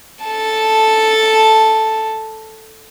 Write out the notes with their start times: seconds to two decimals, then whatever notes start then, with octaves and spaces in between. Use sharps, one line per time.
0.24 A4 A5